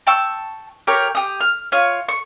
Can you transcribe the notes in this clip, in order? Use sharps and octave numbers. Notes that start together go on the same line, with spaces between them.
G5 A5 C#6 E6
G4 A#4 C#5
G4 D#6
F6
F4 C#5
C#6